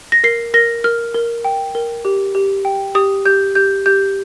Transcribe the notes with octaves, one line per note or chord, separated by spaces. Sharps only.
A#6
A#4 C7
A#4 A#6
A#4 F6
A#4
G5
A#4
G4
G4
G5
G4 D#6
G4 G6
G4 G6
G4 G6